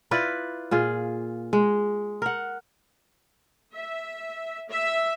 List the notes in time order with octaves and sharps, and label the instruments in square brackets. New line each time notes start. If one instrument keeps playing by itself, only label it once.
[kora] E4 F4 B4 D5
A#2 F4 G#4
G#3
A#4 F#5
[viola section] E5
E5